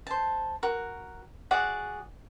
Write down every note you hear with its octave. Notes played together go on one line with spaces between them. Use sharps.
C5 A5
F#4 A#4
F#4 G#4 D5 F#5